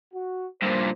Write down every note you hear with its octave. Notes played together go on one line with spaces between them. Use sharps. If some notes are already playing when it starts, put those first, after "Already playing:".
F#4
G2 A#2 C5